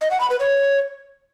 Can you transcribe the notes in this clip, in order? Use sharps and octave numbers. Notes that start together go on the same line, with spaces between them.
D#5
F#5
B5
B4
C#5